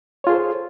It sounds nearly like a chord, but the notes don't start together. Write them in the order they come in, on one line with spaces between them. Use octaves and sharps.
C#5 F4 G#4 A4 C5